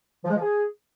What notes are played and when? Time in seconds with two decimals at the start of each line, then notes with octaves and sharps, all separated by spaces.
0.24 F3
0.30 G#3
0.36 F3
0.42 G#4